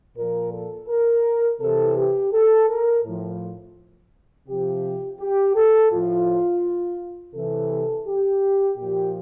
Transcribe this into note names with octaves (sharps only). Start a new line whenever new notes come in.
A#2 F3 A#4
A4
A#4
C3 E3 A4
G4
A4
A#4
A2 F3
C3 F3 G4
G4
A4
A2 F3 F4
C3 E3 A4
G4
A#2 F3 G4